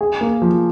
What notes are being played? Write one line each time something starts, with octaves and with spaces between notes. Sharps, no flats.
G#4
A#3
F3